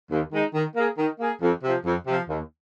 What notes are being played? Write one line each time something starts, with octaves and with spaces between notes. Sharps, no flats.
D#2
D#3 G#3 D#4
D#3
A#3 G#4
D#3
A#3 G#4
F2
C3 F3
F2
C3 F3
D#2